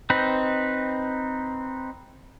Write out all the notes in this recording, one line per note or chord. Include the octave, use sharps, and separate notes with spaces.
C4 D#4 B4